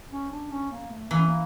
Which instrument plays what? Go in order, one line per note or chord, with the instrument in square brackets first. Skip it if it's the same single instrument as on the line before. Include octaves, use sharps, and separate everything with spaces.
[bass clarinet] C#4
D4
C#4
A#3
A3
[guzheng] E3 [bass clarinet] A#3
[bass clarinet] C#4
A#3